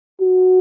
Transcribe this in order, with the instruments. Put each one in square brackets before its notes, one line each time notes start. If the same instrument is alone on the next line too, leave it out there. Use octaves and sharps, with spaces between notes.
[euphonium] F#4